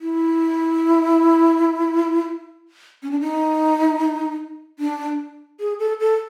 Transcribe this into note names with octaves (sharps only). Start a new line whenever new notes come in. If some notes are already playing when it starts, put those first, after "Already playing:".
E4
C#4
D4
D#4
D4
G#4
A4
A4